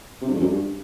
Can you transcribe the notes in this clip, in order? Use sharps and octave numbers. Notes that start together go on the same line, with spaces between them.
C3
G2
F2
F#2
G2